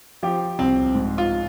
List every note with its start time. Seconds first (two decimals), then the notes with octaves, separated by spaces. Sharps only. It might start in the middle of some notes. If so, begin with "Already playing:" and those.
0.23 F3 G4
0.59 C2 C4
0.94 G#2
1.18 F4